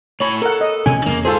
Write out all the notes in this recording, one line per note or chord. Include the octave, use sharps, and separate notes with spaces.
A2 C#5 B5
A4 A#4 F#5
D#5
A1 B2 C#4 G#5
E2 C#3 A#3
G#2 F4 G#4 A4 C5